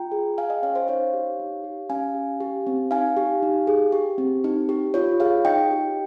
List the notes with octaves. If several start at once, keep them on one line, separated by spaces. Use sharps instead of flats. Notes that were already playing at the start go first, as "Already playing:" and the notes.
Already playing: F4 G5 A#5
G#4
G#4 F5 G#5
D#5 G5
C#4 C#5 F5
C5 D#5
D#4 C#5 F5
G4
D#4
G4
C#4 F5 G#5
G4
G4
C4
D#4 F5 G#5
G4
D#4
G#4
G4
C4
D#4
G4
F4 C#5
G#4 C#5 F5
D#4 D#5 G5
G4